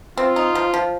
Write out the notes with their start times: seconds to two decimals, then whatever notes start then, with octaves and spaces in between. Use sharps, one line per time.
0.17 C4 F4
0.36 D#4
0.55 F3
0.74 F3